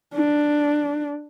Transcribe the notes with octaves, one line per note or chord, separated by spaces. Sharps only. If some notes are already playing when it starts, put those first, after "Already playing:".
D4